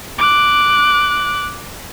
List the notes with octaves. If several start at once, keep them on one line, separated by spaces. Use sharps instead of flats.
D6 F#6